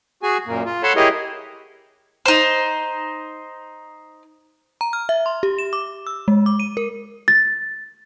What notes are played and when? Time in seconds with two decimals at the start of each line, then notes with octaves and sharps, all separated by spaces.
0.23 F#4 G#4 G#5
0.47 F#2 A#2 A#3
0.66 F4
0.83 A4 C#5 F#5 A5 B5 C6
0.96 E4 G4 G#4 A#4 C#5 D#5
2.26 D#4 C5
4.81 A#5
4.93 F6
5.09 E5
5.26 C6
5.43 G4
5.58 E7
5.73 D6
6.07 E6
6.28 G#3
6.46 D6
6.60 D#7
6.77 A#4
7.28 A6